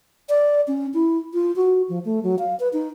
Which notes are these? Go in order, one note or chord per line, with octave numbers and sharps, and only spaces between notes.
D5
C#4
E4
F4
F#4
F3
A3
F#3
F5
B4
D#4